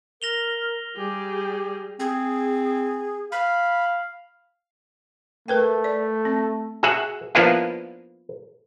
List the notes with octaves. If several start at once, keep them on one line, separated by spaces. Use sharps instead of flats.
A#4 A#6 F7 G7
G3 G4 G#4
C4 G#4
F5 B5
A3 A#4 B4 G5
D5
C4
F#4 G#4 E5 F#5
F3 A#3 B3 D4 E4 F4